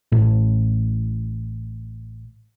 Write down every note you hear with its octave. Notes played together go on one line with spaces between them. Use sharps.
A1 A2